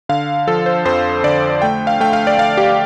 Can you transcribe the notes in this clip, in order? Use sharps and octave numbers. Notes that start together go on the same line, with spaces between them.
D3 F5
F3 A4
C5
F2 C5
D3 D5
A3 G5
F5
A3 G5
F5
D5
A3 F5
G4